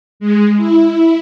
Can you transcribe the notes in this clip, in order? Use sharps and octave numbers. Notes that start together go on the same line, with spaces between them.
G#3
E4